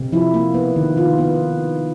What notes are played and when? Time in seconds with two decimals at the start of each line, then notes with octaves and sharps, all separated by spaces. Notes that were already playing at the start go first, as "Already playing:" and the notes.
Already playing: C3
0.12 F3 E4
0.34 A#3
0.54 B3
0.76 D#3
0.97 D#3 F4
1.18 B3